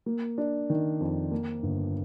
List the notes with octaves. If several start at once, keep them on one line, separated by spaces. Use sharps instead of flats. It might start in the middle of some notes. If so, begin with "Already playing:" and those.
A#3
D4
D#3
F2
A#3
G1